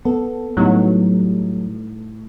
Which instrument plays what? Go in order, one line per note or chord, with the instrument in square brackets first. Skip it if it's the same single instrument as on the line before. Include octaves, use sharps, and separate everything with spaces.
[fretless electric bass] B3 [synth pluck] A4
[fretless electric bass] A2 [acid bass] F#3 [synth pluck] G3 B3 D#4